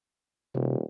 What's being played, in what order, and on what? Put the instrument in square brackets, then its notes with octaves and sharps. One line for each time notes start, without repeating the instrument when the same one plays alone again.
[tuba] D#1 [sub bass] C3